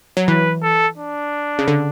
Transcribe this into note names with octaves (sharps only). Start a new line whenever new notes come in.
F#3
E3 B4
A4
D4
C#3
D3